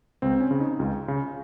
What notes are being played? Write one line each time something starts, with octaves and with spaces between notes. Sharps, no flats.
C#2 C4
C#4
C#3
D#4
C#2 F4
C#3